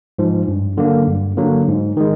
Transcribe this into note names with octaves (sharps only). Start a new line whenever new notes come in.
G#2 F3
G2
D3 F#3 A#3
G2
D3 F#3 A#3
G#2
D#3 G#3